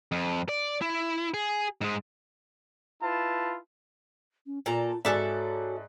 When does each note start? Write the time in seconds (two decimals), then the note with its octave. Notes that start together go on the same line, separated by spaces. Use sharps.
0.12 F2
0.49 D5
0.81 E4
1.34 G#4
1.81 G#2 G#3
3.03 E4 F4 B4 A5
4.46 C#4
4.66 A#2 F4 A4 A#5
5.05 G#2 C#4 F#4 A4 D5 E5 F#6